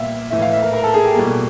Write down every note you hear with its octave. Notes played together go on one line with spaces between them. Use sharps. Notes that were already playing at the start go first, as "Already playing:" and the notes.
Already playing: A#2 G3 B3 E5 F5 G5
A2 E3 A3 E5
F5
E5
A#4
A#4
A4
G#4
G4
B2 G3 A#3